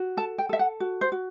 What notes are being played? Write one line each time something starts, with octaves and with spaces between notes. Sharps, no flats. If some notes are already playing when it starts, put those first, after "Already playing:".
Already playing: F#4
A4 A5
G5
A4 E5
F#5
F#4
C5
F#4